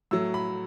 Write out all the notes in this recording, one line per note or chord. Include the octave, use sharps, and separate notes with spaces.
A2 F#3 E6
B5